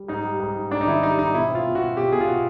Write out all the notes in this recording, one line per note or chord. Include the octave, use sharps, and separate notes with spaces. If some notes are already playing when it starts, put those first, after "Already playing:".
Already playing: G3
G#2 D#4
G3
G#2
G#2
G#2 D4
D#4
D#3 E4
G3 D#4
G#2 D#4
B2 E4
C4
F4
B2
F#4
B2
B2 G4
B2 G#4
F4
B2 F#4